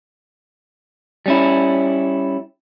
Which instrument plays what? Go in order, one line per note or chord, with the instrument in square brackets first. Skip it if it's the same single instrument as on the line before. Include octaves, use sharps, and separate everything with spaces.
[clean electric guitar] G3 C#4 E4